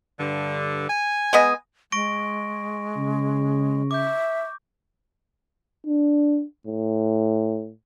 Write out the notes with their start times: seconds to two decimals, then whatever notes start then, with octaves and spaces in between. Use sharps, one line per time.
0.19 G2 D3
0.89 G#5
1.33 G#3 B3 D#5
1.92 G#3 C#6 A#6 D7
2.96 C#3
3.91 E5 D6 G6
5.86 D4
6.67 A2